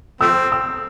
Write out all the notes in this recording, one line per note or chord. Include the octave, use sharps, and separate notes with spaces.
F3 A3 C4 E6
E6